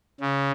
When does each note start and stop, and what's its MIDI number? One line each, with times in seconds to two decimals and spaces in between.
0.20 0.51 49